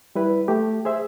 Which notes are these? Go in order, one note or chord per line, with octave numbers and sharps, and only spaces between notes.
G3 E4 B4
A3 G4
G#4 C5 E5